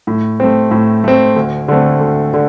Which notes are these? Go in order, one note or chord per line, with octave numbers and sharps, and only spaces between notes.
A2
A3 C4
A2
A3 C4
D2
D3 A3 C4
D2
D3